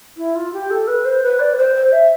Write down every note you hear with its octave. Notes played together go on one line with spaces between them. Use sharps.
E4
F4
G4
A4
B4
C5
B4
D5
B4
C5
C5
E5